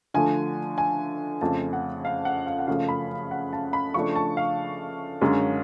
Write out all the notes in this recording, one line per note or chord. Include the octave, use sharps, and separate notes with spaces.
D3 F3 A3 G#5
G#5
F2 C#3 F3 A3 A5
F#5
F5
F#5
F5
F#5
F#2 C#3 F3 A3 F5
B5
F#5
A5
B5
C#3 F3 A3 D4 C#6
A5
F5
F#2 D3 G#3 C#4